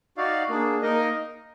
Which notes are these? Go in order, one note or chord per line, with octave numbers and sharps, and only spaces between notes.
D#4 F#4 D5 F5
A#3 D4 G#4
A#3 D#4 A#4 D#5